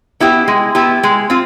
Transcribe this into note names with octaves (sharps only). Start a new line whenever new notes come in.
B3 E4 G4
G#3
B3 E4 G4
G#3
C4 F4